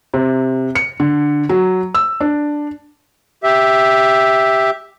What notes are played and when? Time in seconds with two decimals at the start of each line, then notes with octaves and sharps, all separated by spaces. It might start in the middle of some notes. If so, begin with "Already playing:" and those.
0.14 C3
0.75 C#7
1.00 D3
1.49 F#3
1.95 E6
2.21 D4
3.43 G4 E5